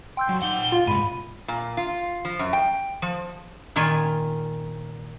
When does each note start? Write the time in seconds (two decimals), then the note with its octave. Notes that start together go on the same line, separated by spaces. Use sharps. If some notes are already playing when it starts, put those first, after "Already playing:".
0.17 G5 C6 E6 G6
0.29 F#2
0.42 D#4 F#5 G7
0.72 F4 F5
0.87 G#2 C3 B5 D#7
1.48 A#2
1.77 F4
2.25 F3
2.39 F#2
2.53 G5
3.02 F3
3.76 A#2 D#3 F4 G#5